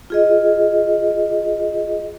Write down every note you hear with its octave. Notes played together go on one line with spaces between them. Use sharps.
F4 G#4 D#5